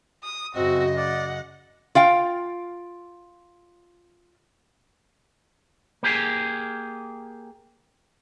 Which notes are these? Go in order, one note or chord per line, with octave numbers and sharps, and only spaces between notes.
D#6
F#2 C#3 C4 F#4 D#5
D5 F#5
F4 F5 G5
A#3 G4 G#4